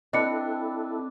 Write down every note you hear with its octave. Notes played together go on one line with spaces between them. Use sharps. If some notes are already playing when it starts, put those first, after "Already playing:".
C4 D4 E4 A4 B4 D#5 C#7